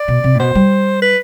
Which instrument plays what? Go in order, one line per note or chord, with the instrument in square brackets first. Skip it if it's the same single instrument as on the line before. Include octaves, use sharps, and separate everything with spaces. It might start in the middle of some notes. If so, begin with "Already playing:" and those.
Already playing: [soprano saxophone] D5
[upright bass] B2
C3
A2
[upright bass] B2 [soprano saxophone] C5
[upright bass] G3
[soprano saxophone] B4